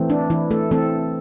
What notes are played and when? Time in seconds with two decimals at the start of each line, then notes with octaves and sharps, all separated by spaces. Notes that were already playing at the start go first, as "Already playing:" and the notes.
Already playing: E3 A3 C4
0.10 D4
0.30 E3 E4
0.51 A3 A4
0.71 E3 A3 C4 A4